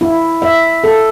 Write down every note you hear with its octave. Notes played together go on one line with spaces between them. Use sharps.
E4
E5
A4